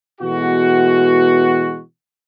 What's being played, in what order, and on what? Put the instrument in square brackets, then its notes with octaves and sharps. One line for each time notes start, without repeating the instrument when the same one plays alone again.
[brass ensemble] B2 E3 G#3 A3 B3 F#4